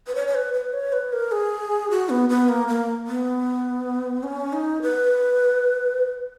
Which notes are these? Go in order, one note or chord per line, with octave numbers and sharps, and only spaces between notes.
B4
C#5
C#5
B4
B4
C#5
B4
A#4
G#4
F#4
B3
B3
A#3
A#3
B3
C#4
D#4
B4